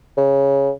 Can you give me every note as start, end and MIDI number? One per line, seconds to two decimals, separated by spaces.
0.18 0.71 49